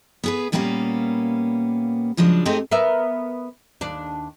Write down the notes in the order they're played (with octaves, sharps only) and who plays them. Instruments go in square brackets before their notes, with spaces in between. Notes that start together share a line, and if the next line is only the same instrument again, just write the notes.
[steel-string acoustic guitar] B3 G#4 B4
A#2 G3 A#3 B3 C#4 F5
C#3 F3 F#3 G#3 D4
A3 C4 D#4 G4 G#4 D#5
[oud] B3 A#4 E5
D#2 D4